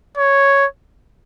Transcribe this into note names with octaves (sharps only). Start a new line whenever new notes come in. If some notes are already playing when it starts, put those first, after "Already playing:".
C#5